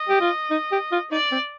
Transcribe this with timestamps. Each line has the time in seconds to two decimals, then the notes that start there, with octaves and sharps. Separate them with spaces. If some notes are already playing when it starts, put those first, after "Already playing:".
Already playing: D#5
0.09 G4
0.21 F4
0.51 D#4
0.72 G4
0.92 F4
1.11 D#4 D5
1.32 C4